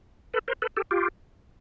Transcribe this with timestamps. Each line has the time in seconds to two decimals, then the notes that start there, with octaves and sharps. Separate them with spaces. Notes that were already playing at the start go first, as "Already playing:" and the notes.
0.34 A4 B4
0.48 A#4 C5
0.62 A4 B4
0.77 G4 A4
0.91 F4 G4